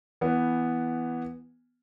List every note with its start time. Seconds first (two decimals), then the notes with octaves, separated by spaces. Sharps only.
0.21 E3 B3